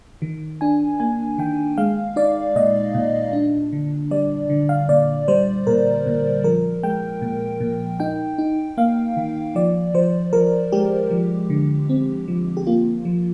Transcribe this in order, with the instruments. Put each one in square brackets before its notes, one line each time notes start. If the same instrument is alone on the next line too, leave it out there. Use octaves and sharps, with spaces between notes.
[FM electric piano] D#3
D4 G#5
A#3 G#5
D#3 G5
G#3 F5
D#4 D5
A#2 D#5
A#2
D4
D3
G3 D5
D3
F5
A#2 D5
G3 C5
A#2 A#4
A#2
F3 A#4
G#3 G5
A#2
A#2
D#4 G5
D#4
A#3 F5
D#3
F3 D5
F3 C5
F3 A#4
G#3 G4
F3
D3
C4
F3
G4
A#3 F4
F3